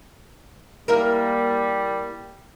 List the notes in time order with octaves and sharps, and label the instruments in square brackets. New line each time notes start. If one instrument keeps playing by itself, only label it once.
[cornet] G3 [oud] A#3 E4 A#4